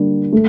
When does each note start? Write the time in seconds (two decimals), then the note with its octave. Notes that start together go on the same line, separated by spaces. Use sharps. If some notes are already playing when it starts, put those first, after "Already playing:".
Already playing: D3 G3 A#3 D4
0.33 A3